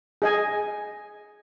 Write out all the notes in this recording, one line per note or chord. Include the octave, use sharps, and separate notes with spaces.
G#4 D#5 G#5